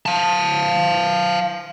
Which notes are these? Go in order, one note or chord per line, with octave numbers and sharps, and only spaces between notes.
F5 A5